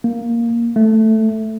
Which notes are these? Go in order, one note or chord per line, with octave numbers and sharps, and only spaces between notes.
A#3
A3